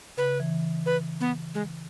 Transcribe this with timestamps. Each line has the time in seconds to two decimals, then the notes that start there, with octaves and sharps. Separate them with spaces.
0.17 C#3 B4
0.40 E3
0.86 B4
1.20 B3
1.54 G#3